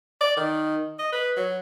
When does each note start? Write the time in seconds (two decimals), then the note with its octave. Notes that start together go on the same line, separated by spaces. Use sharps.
0.21 D5
0.37 D#3
0.99 D#5
1.13 B4
1.37 F#3